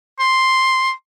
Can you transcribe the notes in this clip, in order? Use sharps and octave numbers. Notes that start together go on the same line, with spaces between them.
C6